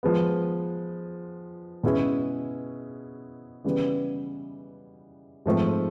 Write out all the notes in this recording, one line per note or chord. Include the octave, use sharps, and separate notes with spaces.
F3 G#3 B3
B2 G#3 C#4 E4 G#4
C#3 E3 G3 B3
G#2 F3 A3 C4